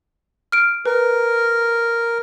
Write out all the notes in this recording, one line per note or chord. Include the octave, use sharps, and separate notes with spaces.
F6 D7
A#4 B4